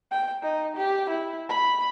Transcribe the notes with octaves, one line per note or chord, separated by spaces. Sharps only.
G5
D#4
G4
E4
B5